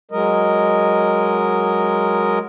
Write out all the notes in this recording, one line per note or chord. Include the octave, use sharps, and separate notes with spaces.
F#3 G#3 A#4 D#5